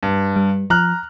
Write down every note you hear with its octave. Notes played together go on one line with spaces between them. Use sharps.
G2
G3
F3 A#5 F6 F#6